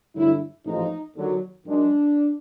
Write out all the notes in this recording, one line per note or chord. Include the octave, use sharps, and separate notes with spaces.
G2 D3 F#3 A3 E4
A1 G#2 F3 D#4
D#2 D3 F#3
F#2 D#3 G#3 D4